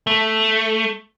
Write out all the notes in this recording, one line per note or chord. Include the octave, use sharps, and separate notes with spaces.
A3